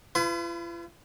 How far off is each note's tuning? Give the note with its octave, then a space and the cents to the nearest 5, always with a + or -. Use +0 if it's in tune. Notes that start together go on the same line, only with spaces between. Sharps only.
F4 -45 B4 +30